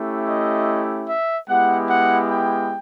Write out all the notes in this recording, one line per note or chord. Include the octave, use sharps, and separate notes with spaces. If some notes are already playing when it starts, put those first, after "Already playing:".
Already playing: A3 C#4 E4 G4
D#5
E5
G#3 B3 E4 G4 F#5
F#5
G5